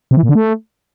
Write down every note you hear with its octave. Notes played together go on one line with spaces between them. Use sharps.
C3
E3
A#2
D3
A3